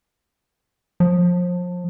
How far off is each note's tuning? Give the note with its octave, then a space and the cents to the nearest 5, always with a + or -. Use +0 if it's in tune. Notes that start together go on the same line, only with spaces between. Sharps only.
F3 +30